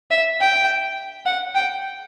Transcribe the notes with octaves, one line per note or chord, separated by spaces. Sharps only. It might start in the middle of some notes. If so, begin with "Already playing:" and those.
E5
G5
F#5
G5